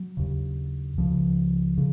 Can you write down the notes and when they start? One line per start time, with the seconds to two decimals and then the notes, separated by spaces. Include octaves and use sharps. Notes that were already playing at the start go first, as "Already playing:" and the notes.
Already playing: F#3
0.17 D#2 C#3
0.98 C#2 C#3 F3
1.78 C#3